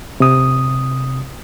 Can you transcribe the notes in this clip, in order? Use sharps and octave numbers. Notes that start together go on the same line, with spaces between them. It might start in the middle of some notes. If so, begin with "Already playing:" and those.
C3 D#6